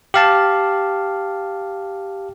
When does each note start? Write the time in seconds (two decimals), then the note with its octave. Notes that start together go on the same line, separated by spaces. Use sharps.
0.14 G4 F5 A5